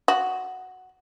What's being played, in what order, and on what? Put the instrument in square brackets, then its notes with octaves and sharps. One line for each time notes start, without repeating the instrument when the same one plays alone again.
[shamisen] F#4